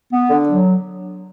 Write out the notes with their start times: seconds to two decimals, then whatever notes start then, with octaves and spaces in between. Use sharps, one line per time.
0.12 B3
0.30 D3
0.49 F#3